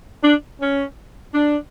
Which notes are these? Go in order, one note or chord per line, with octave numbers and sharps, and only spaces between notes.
D4
C#4
D4